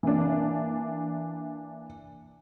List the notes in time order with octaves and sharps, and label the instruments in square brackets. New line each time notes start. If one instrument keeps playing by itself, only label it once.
[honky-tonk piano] E3 A#3 D4